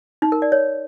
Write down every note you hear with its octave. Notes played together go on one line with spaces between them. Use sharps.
D#4
A#4
D5
C#5